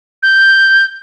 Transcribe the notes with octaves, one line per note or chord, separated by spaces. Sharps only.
G6